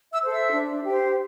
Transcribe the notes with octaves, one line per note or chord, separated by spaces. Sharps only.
E5 E6
A4 C5
E5 E6
D4
G4 C5